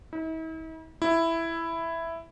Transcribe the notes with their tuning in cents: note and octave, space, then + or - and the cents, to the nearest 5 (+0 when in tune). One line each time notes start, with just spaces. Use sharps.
E4 -45
E4 +5